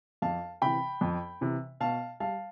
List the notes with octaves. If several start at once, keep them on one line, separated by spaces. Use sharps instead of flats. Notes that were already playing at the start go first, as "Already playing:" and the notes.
F2 F5 A5
C3 E3 G5 B5
F2
C3 E3
B2 F5 A5
G3 F5 A5